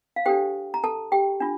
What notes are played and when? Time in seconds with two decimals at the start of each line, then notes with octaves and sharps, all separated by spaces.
0.16 F5
0.26 D4 G4 A4 C5 G5
0.74 A#5
0.83 A4 A5
1.12 G4 G5
1.40 D4 F4